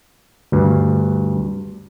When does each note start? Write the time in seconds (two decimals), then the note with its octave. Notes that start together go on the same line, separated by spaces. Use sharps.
0.52 D2 G2